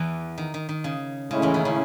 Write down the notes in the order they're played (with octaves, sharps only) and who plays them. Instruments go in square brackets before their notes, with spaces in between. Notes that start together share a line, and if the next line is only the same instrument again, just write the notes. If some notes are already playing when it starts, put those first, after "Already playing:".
Already playing: [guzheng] E2 E3
D#3
D#3
D#3
C#3
[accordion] A2 G#3 C#4 E4 [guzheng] C#3
[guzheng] E2 E3
D#3
C#3